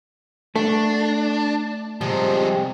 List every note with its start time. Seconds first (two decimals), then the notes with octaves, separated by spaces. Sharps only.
0.56 A3 D4 F#4
2.01 C3 F3 G3 G#3